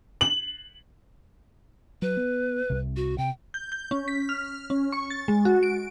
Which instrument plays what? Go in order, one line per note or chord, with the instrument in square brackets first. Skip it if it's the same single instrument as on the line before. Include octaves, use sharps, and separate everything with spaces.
[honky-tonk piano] F#7
[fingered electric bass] F#3 [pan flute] B4
[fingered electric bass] B3
C2 C3
[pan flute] F#4
[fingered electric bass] C3 [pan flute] G5
[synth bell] G6
G6
C#4
B6
F6
C#4
C#6
A6
G#3
F#4
D7